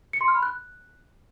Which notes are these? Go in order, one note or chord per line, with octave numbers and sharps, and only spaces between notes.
C#7
C6
F6
B5
F#6